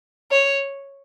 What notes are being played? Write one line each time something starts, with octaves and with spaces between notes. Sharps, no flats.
C#5